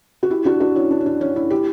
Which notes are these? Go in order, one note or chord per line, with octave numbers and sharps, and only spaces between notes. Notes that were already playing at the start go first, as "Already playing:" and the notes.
F#4
E4 G4
D4 F#4
D4 F#4
C#4 E4
D4
C#4
D4
C#4
C#4 E4
E4 G4